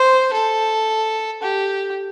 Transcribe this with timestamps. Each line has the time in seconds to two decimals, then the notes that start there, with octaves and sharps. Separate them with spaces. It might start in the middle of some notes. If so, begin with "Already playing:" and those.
Already playing: C5
0.32 A4
1.42 G4